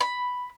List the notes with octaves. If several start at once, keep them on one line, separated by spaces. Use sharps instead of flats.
B5